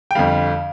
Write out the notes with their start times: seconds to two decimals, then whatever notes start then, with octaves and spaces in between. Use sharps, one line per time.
0.11 G5
0.15 F2 D3 G3 F5